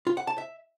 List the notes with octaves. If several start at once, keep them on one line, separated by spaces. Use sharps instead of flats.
F4
F#5
A5
E5